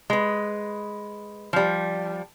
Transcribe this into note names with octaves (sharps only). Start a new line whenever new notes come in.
G#3 B4
F3 G3